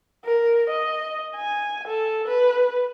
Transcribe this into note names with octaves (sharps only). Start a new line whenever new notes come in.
A#4
D#5
G#5
A4
B4